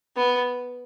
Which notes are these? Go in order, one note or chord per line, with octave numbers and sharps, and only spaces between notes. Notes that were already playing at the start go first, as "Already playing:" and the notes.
B3